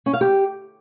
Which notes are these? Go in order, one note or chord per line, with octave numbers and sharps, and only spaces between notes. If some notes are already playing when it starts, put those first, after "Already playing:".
C#4
F5
G4